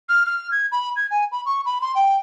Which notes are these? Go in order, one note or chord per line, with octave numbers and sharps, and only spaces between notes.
F6
F6
G#6
B5
G#6
G#5
B5
C#6
B5
C6
G5